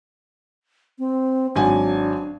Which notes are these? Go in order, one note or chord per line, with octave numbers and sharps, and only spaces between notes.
C4
G#1 F#3 D4 G#5